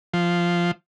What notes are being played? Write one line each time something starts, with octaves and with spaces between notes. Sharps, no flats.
F3